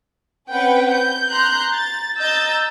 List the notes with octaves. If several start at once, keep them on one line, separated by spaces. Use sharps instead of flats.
C4 C#4 B4 F#5 G5
G6
A#5 C6 F#6 G6
A6
D#5 A#5 E6 G6 A6